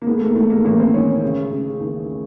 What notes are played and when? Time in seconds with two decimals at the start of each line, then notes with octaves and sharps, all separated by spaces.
0.02 A#3
0.07 G#2 B3
0.17 A3
0.21 A#3
0.35 G#2 A3
0.50 A#3
0.64 A1 A#3
0.80 C4
0.94 D#3 C#4
1.23 C#3
1.52 C#3
1.80 D#2